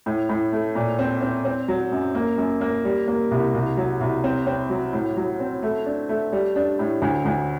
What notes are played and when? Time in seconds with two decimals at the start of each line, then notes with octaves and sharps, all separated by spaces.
0.06 A2
0.29 A2
0.52 A3
0.75 A#2
0.99 C4
1.22 C4
1.45 C4
1.68 F#3
1.92 F#2
2.15 A#3
2.37 F#2
2.61 A#3
2.85 G3
3.08 A#3
3.31 C2
3.54 C2
3.77 F#3
4.01 C2
4.24 C4
4.47 C4
4.70 F#3
4.93 A2
5.17 F#3
5.40 C4
5.63 A3
5.86 D4
6.09 A3
6.32 G3
6.56 D4
6.79 A2
7.02 D2
7.25 D2